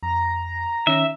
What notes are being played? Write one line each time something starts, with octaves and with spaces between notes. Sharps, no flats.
F2 A#5
D#3 C#4 E5